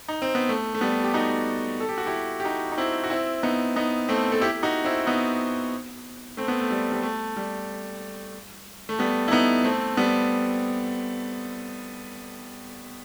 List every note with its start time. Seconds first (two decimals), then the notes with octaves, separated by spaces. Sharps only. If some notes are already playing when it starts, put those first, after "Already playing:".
0.08 D#4
0.22 C4
0.35 B3
0.49 A3
0.74 A3
0.81 G3 B3
1.04 G4
1.14 D#4 F#4
1.80 A4
1.89 G4
1.98 F#4
2.06 E4 G4
2.40 G4
2.45 D#4 F#4
2.72 D#4
2.78 C4 E4
3.04 F#4
3.10 C4 E4
3.43 B3 D#4
3.76 B3 D#4
4.09 A3 C4
4.32 A4
4.41 E4 G4
4.63 D#4 F#4
4.85 C4 E4
5.07 B3 D#4
6.37 A3 C4
6.48 B3
6.60 A3
6.71 G3
6.92 G3
7.03 A3
7.36 G3
8.89 A3
8.99 G3 B3
9.28 E4
9.31 B3 D#4
9.64 A3 C4
9.97 G3 B3